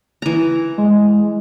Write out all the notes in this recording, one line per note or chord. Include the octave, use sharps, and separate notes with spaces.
E3 A#5
G#3